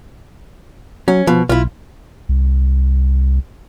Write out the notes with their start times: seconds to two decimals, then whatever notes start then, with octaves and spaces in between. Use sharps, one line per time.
1.08 F#3 C#4
1.27 B2 F3
1.49 B1 E4 F4
2.29 C2